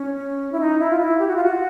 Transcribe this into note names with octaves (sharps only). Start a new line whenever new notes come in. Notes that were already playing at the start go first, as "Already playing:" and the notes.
Already playing: C#4
E4
D#4
E4
F4
E4
G4
F#4
F4
F#4